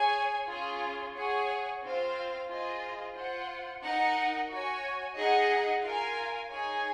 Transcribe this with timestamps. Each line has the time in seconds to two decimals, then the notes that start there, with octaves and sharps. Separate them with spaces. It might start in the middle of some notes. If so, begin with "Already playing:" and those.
Already playing: G#4 C#5 G#5
0.48 C#4 F4 G#4
1.15 G#4 C#5 F#5
1.82 C4 F4 C5 F5
2.49 F4 G#4 C5 D#5
3.16 F4 C5 F#5
3.82 D#4 A#4 D#5 F#5
4.50 F#4 C#5 G#5
5.17 D#4 G#4 D#5 F#5
5.83 F4 A#4 F5 G#5
6.50 D#4 G#4 C#5 G#5